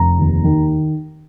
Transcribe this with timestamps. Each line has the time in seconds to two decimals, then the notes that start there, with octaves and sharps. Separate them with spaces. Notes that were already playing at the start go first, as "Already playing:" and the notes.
Already playing: F1 A#5
0.19 D#2
0.44 D#3